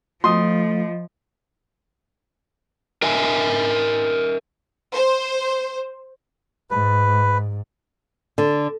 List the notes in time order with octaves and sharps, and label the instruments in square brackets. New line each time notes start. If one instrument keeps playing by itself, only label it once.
[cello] F3 [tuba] A3 [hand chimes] F4 D#5 [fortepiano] C6 D#6
[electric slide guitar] A#4 D#5 E5 G#5
[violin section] C5
[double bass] G#2 [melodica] B4
[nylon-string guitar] D3